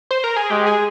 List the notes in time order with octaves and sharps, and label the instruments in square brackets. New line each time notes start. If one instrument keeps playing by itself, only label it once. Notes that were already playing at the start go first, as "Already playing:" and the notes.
[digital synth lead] C5
A#4
G#4
[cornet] G#3 [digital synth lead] G4
[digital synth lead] G#4